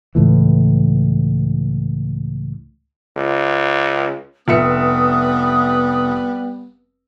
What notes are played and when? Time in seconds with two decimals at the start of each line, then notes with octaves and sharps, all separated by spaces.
0.15 C#2 A2 E3
3.17 C#2
4.48 F1 G3 B3 E5 D#6 C#7